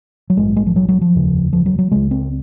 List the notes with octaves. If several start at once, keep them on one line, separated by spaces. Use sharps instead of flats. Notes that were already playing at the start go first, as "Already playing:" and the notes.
F#3
A#1 G#2 G#3
G#3
F3
F#3
F#3
F3
F1 D#2 C#3
F3
F#3
F#3
C#2 C#3 G#3
C4